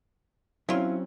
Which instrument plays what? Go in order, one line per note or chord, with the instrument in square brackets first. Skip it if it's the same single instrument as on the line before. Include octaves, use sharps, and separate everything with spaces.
[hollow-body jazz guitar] F#3 C4 C#4 [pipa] E4 F4